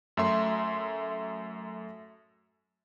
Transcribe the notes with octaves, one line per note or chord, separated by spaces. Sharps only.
F#2 A3 E5 C6